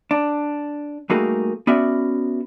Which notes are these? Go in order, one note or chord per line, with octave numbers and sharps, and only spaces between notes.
D4
G3 A3 A#3 D#4 F#4 G#4
B3 C#4 F#4 D5 E5